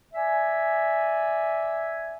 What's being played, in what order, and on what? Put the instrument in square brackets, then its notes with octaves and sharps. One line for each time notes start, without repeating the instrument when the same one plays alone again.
[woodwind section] D5 E5 G#5